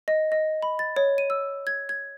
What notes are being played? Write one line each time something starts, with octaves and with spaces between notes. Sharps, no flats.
D#5
D#5
B5
A6
C#5
D#7
E6
G#6
G#6